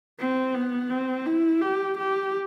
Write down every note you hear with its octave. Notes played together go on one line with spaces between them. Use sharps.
C4
B3
C4
E4
G4
G4